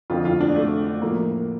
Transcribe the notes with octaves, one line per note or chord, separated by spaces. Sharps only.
F2 D3 F3 F4
F4
D4
A3
A2 F3 A#3